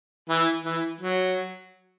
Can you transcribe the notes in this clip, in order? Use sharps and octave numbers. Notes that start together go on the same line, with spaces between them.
E3
E3
F#3